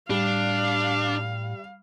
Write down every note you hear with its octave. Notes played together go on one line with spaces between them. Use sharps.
A2 G3 D4 F5